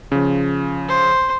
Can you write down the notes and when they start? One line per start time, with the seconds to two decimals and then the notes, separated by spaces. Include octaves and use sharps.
0.12 C#3 F3
0.88 C5